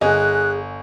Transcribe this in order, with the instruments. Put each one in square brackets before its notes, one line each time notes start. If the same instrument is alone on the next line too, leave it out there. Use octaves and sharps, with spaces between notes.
[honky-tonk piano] G1 D#5 G#5 [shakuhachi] G#4 [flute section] F#6